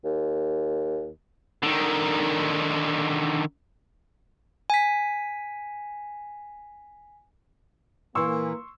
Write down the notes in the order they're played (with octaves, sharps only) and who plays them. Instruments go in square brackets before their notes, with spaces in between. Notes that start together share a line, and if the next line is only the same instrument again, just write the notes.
[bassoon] D#2
[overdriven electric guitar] D3 D#3
[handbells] G#5 B6
[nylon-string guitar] A#2 E3 [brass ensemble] A#3 [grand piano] C6 C#6 E6